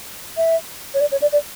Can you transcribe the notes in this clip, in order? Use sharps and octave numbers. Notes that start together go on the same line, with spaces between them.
E5
C#5
D5
C#5
D5
D5